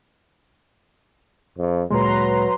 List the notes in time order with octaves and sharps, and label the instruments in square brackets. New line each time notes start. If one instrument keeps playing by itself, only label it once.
[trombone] F2
[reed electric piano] D2 A#2 G#3 [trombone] F#3 [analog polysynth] B4 A#5 C6